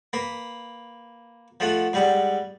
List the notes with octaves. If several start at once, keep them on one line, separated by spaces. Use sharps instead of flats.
A#3 B4
F3 A3 F#5
G#2 G3 F#5